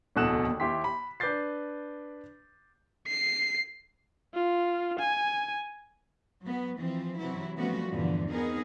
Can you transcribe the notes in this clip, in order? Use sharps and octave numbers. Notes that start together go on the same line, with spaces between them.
D1 E2 B2 A4 F#6 E7
D#2
D#2 E4 G4 C6 B6
B5
D4 B4 D6 G6 A6 C7
C7
F4
G#5
F#3 B3
E3 F3 C4
C3 E3 F#3 E4
F3 G3 A3 B3 C#4 F#4
E2 G2 A#2 D3 E3 F3
B3 C4 D#4 G#4 A#4